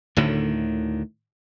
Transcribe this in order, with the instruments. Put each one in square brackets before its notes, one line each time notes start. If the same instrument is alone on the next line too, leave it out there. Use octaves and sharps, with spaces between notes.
[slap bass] D2 A2 D3 D#3